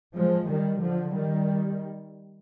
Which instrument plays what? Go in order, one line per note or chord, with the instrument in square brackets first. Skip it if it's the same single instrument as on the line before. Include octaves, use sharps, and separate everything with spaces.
[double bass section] F3 G#3
D#3 G3
D3 F3
D#3 G3